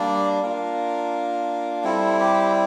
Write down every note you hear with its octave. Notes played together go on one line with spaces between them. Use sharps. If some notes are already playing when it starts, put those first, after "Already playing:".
Already playing: G3 A#3 D4 D5
A#3 D4 F4 A#4
G3 C4 E4 A4
G4